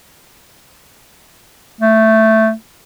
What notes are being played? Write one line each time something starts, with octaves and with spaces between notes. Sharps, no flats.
A3